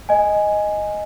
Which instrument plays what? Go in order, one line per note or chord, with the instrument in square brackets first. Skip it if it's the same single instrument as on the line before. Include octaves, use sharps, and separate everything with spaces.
[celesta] D#5 G#5